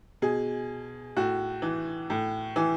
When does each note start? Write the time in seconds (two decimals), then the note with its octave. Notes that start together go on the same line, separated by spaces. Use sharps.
0.22 B2 G#4
1.16 A2 F#4
1.62 E3
2.10 A2
2.56 E3